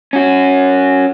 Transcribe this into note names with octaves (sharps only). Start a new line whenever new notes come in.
C#4 F#4